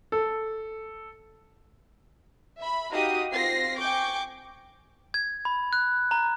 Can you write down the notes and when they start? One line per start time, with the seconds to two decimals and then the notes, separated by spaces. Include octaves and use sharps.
0.12 A4
2.59 E5 B5
2.91 D#4 F#4 G4 F5 A#5 D#6
3.32 C4 F4 A#6 C7
3.78 G5 G#5 C#6 D6 G6
5.14 G#6
5.45 B5
5.73 F#6
6.11 A#5